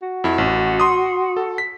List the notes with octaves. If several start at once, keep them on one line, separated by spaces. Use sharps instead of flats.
F#4
F2 E4
A1
C6 D#6
A4
B6